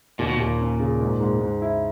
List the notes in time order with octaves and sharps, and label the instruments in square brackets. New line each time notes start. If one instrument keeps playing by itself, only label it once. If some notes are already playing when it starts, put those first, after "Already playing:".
[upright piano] D#2 [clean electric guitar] A#2
[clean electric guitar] B2
[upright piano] D#2 [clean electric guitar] A#2
[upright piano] C#4
C#3
G#2
G#2
G#2
E4